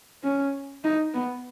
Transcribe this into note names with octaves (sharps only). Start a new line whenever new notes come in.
C#4
D#4
B3